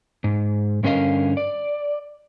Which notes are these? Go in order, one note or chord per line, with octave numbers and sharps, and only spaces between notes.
G#2
G2 D3 C#4 A#4 D#5 F5
D5